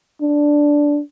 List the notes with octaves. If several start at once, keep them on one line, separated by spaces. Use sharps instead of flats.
D4